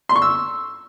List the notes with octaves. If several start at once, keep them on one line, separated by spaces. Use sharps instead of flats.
C6
C#6
E6